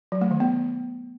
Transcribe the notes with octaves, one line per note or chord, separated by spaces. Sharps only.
F#3
A3
D#3
B3